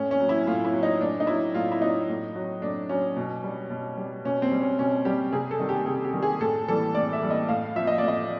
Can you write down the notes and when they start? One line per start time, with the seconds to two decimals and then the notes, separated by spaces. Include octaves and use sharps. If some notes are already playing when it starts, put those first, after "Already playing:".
Already playing: A2 C#4
0.11 C#4
0.20 F#3
0.29 E4
0.47 A2 F4
0.65 E4
0.73 F#3
0.83 D#4
1.01 A2 D4
1.20 D#4
1.27 F#3 E4
1.54 A2 F4
1.72 E4
1.82 F#3 D#4
2.09 A2
2.35 F#3
2.62 A2 D4
2.89 F#3 C#4
3.17 B2
3.44 G3
3.70 B2
3.97 G3
4.25 B2 C#4
4.42 C4
4.52 G3
4.61 C#4
4.78 B2 C#4
5.05 G3 G4
5.32 C3 G#4
5.51 A4
5.59 D#3 G3
5.69 G4
5.86 C3 G#4
6.05 G4
6.13 D#3 G3
6.22 G#4
6.40 A2 A4
6.68 E3 G3 A4
6.95 A2 D5
7.13 E5
7.22 E3 G3
7.30 D#5
7.49 A2 F5
7.76 F3 E5
7.87 D#5
7.98 A2 D5
8.08 D#5